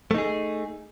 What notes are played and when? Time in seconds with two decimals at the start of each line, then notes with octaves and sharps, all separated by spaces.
0.11 A3
0.14 D#4
0.18 G#4